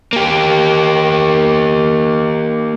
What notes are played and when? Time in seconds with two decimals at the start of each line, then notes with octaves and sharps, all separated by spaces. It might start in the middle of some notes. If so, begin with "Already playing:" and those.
0.13 A#3 G4